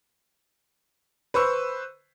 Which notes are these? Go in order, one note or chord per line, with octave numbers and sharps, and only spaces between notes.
B4 C5 C#6 E6